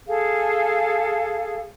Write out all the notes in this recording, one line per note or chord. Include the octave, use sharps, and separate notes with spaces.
G#4 A4 F5